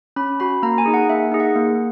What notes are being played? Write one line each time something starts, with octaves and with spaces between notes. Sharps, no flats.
C#4 B5
F#4 B5
A#3 A#5
G#5
D#4 G#4
F#5
A#3 E5
D#4 G#4
F#5
A#3